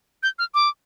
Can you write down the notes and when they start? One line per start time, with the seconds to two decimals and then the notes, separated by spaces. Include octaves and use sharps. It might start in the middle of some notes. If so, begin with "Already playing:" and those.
0.23 G6
0.39 F6
0.54 D6